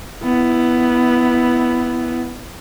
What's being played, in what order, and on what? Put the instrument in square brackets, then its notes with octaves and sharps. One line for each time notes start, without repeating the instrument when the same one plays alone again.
[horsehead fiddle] B3 E4